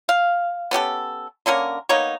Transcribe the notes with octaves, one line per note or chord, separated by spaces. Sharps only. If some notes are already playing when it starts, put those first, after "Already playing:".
F5
B3 C#4 G4 A4
D3 A#3 C#4 A#4
A#3 B3 D#4 C#5